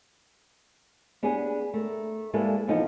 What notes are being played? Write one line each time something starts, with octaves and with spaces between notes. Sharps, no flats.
B3 D4 G4 G#4
A3 A#4
G3 G#3 A#3 E4 A4 B4
C3 E3 F3 B3 D#4 A4